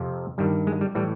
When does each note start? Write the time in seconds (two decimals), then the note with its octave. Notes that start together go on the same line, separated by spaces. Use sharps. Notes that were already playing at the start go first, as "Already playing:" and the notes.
Already playing: F2 C3 F3
0.38 G2 D#3 G3
0.67 G#3
0.81 G3
0.95 A2 E3 G3